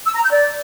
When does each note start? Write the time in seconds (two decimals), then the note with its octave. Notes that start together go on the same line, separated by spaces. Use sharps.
0.05 E6
0.13 A#5
0.22 G6
0.31 D5